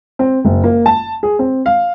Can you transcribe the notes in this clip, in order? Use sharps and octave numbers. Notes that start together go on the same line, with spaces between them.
C4
F#1
A#3
A5
G#4
C4
F5